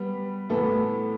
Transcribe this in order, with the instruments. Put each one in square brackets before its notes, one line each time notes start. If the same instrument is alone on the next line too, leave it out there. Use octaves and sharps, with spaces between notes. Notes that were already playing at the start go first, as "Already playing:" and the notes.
Already playing: [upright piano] G3 B3
A2 E3 B3 E4 A4